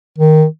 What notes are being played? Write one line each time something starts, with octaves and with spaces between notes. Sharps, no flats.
D#3